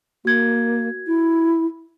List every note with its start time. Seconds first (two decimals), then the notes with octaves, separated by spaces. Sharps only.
0.25 A#3 F#4 G#6
1.07 E4